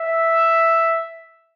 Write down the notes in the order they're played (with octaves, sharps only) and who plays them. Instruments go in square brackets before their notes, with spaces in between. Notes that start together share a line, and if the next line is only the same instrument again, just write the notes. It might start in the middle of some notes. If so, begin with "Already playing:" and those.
Already playing: [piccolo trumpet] E5